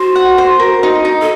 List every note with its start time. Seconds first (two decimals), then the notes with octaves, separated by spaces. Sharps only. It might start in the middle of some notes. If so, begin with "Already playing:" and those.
Already playing: F#4 C5
0.16 F#5
0.38 C5
0.60 A#4
0.83 D#4
1.05 D#4
1.20 A4